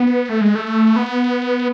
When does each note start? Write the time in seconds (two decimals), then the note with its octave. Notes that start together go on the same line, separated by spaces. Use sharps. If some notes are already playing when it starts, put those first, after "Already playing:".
Already playing: B3
0.29 A3
0.41 G#3
0.55 A3
0.96 B3